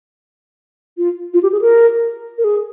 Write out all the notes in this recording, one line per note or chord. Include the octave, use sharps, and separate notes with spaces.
F4
F4
G4
G#4
A#4
A#4
G#4